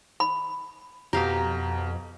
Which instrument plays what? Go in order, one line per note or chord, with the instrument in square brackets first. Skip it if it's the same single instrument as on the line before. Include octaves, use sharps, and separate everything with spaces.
[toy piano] B5
[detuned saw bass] F2 [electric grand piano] B2 A#5 [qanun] G4 F5